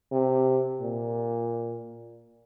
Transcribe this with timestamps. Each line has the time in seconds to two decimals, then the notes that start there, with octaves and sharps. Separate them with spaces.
0.12 C3
0.82 A#2